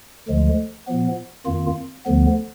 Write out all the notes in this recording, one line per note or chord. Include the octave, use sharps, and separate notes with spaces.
D2 D3 F3 G#3
A#2 F3 B3
F2 D#3 A#3 F4
D2 D3 F3 B3